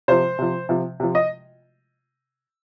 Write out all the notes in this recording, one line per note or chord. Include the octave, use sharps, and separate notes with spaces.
C3 F3 C5
C3 F3
C3 F3
C3 F3
D#5